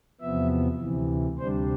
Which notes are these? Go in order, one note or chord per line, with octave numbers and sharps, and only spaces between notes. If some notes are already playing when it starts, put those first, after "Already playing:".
E2 C3 F3 B3 E5
D2 C3 E3
D2 C3 G3 D4 C5